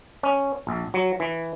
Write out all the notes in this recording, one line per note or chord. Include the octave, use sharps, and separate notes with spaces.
C#4
A#1
F#3
E3